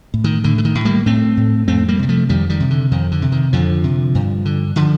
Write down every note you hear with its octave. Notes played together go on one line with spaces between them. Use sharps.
A2
D#3
A2 D3
D3
D#3
A2
G3 A#3
A2 A3 C4
A2
F2 A3 C4
G3 A#3
C3 G3
F3 A3
F2 D#3 G3
D#3 G3
C3
D3
F2 D#3
D3
C3
D#3
F2 D3 F3
C3
G2
D3
D3 F3